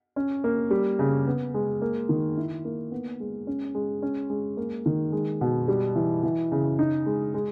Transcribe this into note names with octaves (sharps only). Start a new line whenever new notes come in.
C#4
A#3
G3
C#3
B3
G#3
A#3
D#3
E4
A#3
B3
G#3
C#4
G#3
C#4
G#3
A#3
D#3
G#3
B2
G3
E3
E3
C#3
D#4
G#3
G#3